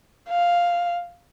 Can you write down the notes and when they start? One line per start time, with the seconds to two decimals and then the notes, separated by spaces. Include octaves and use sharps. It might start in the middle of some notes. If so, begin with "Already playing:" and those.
0.29 F5